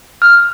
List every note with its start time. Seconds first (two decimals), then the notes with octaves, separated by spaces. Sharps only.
0.22 F6